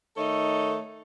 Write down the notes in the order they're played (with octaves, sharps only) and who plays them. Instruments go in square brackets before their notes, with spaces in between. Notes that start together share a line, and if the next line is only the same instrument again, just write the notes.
[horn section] D#3 A3 D#4 A4 C#5